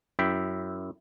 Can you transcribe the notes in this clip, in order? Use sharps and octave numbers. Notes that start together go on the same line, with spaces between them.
F#2 E4 E5 G5